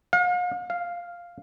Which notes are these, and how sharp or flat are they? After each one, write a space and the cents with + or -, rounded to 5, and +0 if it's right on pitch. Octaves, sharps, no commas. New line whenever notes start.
F5 +45
F5 +0